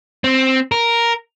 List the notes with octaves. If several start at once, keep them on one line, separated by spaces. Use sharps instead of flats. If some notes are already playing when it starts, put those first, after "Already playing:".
C4
A#4